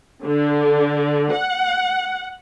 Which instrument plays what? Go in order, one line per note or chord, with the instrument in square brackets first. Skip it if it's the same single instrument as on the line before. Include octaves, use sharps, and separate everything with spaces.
[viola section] D3
F#5